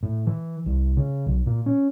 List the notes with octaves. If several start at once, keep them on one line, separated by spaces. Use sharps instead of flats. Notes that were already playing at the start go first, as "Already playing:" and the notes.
A2
E3
C2
C#3
B1
A#2
C#4